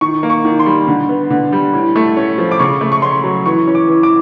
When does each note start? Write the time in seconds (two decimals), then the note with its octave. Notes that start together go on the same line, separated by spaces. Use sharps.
0.01 D#3 C#6
0.23 A#3
0.30 C#6
0.45 D#3
0.59 C6
0.66 G3
0.88 D3
1.09 B3
1.30 D3
1.52 G3
1.74 A2
1.96 A3
2.17 C#4
2.38 F3
2.51 D6
2.60 C#3 C#6
2.81 A3
2.92 C#6
3.02 C#4 C6
3.24 F#3
3.46 E3 C#6
3.68 C#4
3.75 D6
3.88 E3
4.03 D6